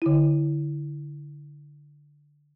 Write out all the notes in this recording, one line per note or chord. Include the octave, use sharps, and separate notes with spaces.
D3 E4